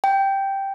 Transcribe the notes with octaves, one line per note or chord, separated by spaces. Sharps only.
G5